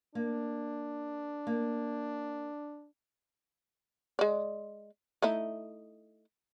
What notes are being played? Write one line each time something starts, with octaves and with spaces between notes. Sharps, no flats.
A#3 D4
A#3
G#3 D5
A3 D#4 E4